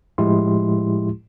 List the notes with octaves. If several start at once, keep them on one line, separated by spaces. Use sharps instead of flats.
A2 F3 G#3 E4 G4 C6